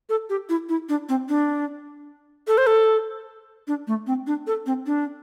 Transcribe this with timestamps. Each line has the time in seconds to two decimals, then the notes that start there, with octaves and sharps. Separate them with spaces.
0.09 A4
0.30 G4
0.49 E4
0.69 E4
0.89 D4
1.09 C4
1.29 D4
2.48 A4
2.58 C5
2.67 A4
3.68 D4
3.87 A3
4.07 C4
4.27 D4
4.47 A4
4.66 C4
4.87 D4